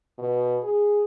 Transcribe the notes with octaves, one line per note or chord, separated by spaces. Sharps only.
B2
G#4